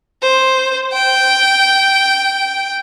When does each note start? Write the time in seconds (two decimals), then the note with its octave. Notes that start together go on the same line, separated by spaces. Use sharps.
0.22 C5
0.93 G5